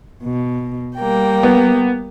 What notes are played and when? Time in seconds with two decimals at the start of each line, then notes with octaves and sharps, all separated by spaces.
0.23 B2
0.96 G3 A#3 G5
1.43 B3